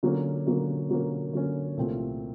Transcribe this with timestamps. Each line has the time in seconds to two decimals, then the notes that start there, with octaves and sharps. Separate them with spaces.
0.03 D3 F#3 A#3 C#4
0.47 D3 F#3 A#3 C#4
0.90 D3 F#3 A#3 C#4
1.33 D3 F#3 A#3 C#4
1.77 C2 A#2 F3 A3 C4